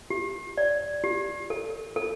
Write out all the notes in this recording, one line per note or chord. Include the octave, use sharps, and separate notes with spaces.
G4
D5
G4
A4
A4